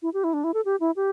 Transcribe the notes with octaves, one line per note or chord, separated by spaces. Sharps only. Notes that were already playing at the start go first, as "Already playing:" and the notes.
E4
G4
E4
D4
E4
A4
G4
E4
G4